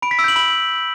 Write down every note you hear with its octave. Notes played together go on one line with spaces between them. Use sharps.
B5 D7
B6
E6 D7
G6 F#7
B5 F#7